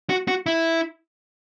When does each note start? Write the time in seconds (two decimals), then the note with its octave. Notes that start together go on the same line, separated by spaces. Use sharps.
0.10 F#4
0.28 F#4
0.46 E4